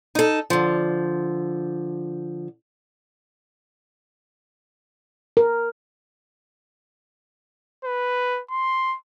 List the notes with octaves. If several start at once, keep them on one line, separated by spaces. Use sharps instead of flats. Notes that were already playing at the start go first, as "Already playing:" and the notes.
D#4 A4
D3 F3
A#4
B4
C6